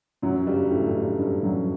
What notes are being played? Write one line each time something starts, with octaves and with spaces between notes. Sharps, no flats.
F#2 F#3
G2 G3
A2 A3
G2 G3
G2 G3
F#2 F#3